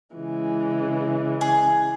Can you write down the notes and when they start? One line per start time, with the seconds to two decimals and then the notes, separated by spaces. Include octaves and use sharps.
0.15 C#3 E3 G#3
1.41 G#4